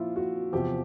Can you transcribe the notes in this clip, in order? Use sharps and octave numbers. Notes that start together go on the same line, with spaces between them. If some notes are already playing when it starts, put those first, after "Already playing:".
Already playing: A#2 F3 E4 F4
F#4
E2 C3 F3 G4